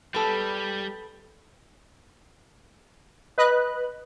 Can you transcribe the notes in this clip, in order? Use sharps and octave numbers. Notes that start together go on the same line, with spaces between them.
G3 B3 A4
B4 D#5 F#6